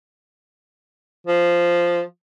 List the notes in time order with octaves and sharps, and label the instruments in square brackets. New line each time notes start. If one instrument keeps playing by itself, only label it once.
[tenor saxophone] F3